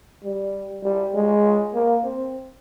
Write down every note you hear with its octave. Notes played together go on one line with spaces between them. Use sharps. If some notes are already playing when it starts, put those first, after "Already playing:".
G3
G3
G#3
A#3
C4